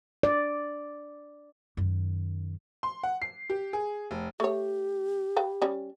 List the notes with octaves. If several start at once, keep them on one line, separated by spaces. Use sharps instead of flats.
D5
F#2 D#3
C6
F#5
C7
G4
G#4
F1
A3 G4 C#5
B4 F5 G5
G3 C#4